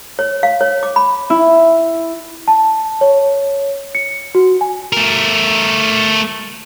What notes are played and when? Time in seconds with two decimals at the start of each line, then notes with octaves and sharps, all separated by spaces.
0.19 C#5
0.43 F5
0.61 C#5
0.83 D6
0.96 B5
1.30 E4
2.48 A5
3.01 C#5
3.95 C#7
4.35 F#4
4.61 G#5
4.93 A3 A#4